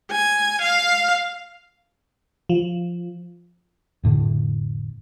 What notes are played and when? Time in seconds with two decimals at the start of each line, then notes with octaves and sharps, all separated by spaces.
0.11 G#5
0.62 F5
2.49 F3
4.03 F1 A2 D3